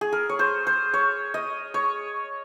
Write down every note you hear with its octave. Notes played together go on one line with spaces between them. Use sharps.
G#4
A#4
C#5
C5
C5
C#5
D#5
C#5